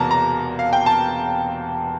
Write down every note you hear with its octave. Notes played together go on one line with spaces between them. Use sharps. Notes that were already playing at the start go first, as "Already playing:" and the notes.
Already playing: E1 E2 C3 E3 A#3 A5 A#5
A#5
F5
G5
A5